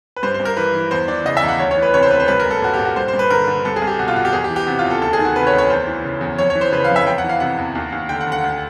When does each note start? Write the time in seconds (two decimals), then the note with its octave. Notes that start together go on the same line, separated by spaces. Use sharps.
0.16 B4
0.23 G2 C5
0.34 C5
0.40 G2
0.45 A#4
0.57 E3 B4
0.75 E3
0.91 E2 C5
1.08 E3 D5
1.25 C#3 D#5
1.37 E5
1.43 E2 F5
1.49 F#5
1.60 D2 C#5
1.71 C#5
1.77 E3
1.83 B4
1.94 C3 C#5
2.03 C5
2.11 D2 B4
2.20 C5
2.28 C2 B4
2.40 A#4
2.46 C2 A4
2.62 A#2 F#4
2.74 G4
2.79 A#2
2.85 F#4
2.96 G2 C5
3.08 C5
3.13 G2
3.19 B4
3.30 D3 A#4
3.47 D3
3.65 C2 A4
3.76 G#4
3.82 C2
3.87 G4
3.99 B2 F#4
4.08 F4
4.16 B2 F#4
4.25 G4
4.33 E2 G#4
4.44 G4
4.50 E3
4.56 G4
4.67 C3 F#4
4.79 F4
4.84 E2
4.90 A4
5.02 D2 A4
5.13 G#4
5.19 D#3
5.25 F#4
5.36 C3 B4
5.47 C#5
5.53 D2
5.58 C#5
5.70 E2 C5
5.87 E3
6.04 C#3
6.21 E2
6.38 F2 C#5
6.50 C#5
6.55 E3
6.61 C5
6.72 C#3 B4
6.84 F5
6.90 F2
6.96 E5
7.07 E2 G5
7.18 F#5
7.24 E3
7.29 F5
7.40 C3 F#5
7.58 E2
7.75 D#2
7.92 D#2
8.09 D3 G5
8.21 F#5
8.26 D3
8.32 F#5
8.44 D2